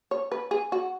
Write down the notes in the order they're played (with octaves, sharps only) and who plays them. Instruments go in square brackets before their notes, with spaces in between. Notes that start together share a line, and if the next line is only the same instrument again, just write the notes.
[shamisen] C#5
B4
G#4
F#4